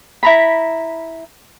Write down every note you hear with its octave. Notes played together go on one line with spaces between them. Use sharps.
E4 A#5 B5